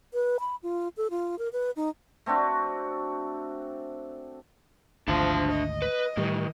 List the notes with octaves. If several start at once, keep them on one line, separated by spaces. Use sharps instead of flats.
B4
B5
F4
A4
F4
A#4
B4
D#4
A3 C4 D4 F#4
G#1 D2 F3 D4 E5 A5
D#5
B4
A2 D#3 E3 G3